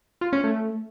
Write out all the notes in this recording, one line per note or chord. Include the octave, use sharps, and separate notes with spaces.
F4
C#4
A3